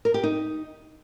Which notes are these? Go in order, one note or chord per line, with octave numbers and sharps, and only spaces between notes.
A#4
G4
D#4